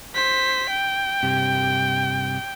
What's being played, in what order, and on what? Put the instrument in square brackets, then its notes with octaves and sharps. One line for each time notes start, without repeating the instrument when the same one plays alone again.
[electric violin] C5 B6
G5
[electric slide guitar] G2 C3 G4